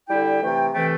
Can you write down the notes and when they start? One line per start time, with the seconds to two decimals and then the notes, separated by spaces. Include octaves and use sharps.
0.08 D3 G3 E4 G5
0.41 C3 E3 A3
0.73 C3 E3 A3 G5